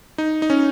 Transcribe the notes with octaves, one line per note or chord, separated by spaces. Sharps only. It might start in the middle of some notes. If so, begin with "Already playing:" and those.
D#4
D#4
C#4